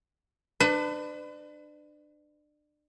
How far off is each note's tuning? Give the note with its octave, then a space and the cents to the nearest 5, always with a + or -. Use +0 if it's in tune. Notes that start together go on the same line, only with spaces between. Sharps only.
D4 +30 B4 +40